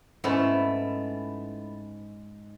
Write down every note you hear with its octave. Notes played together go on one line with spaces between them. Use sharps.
G#2 A3 B3 C#4 E4